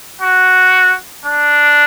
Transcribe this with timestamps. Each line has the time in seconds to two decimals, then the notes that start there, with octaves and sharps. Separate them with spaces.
0.21 F#4
1.25 D4